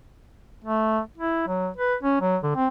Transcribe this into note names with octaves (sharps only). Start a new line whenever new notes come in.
A3
E4
F#3
B4
C#4
F#3
D3
C4